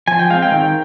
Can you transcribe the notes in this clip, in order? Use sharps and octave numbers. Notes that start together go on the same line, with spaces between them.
F3 G#5
G5
G#3 C4 F5
G5
D#3